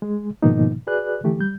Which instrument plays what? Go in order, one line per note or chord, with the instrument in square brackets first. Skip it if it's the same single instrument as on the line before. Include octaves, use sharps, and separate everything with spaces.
[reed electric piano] G#3 G#4
G#2 B2 D#3 F3 A#3 D#4
F#4 G#4 B4 D5 F#6
D3 E3 A3 G4
G3 G6